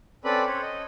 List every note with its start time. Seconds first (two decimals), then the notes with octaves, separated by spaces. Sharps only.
0.24 C4 C#4 A4 B4 D5 B5
0.47 C5 C#5
0.62 D#5